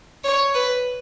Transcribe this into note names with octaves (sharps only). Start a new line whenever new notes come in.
C#5
B4